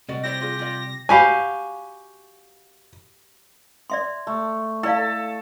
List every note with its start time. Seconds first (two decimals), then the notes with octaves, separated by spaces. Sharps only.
0.09 C3 G3 F#4 D5 D#5
0.23 E4 G4 C5 D5 A#6
0.41 F4 G#4
0.59 F4 D5
1.09 F#4 G4 F5 G#5 B5
3.90 D5 E5 C6
4.27 A3
4.83 E4 A4 D5 F5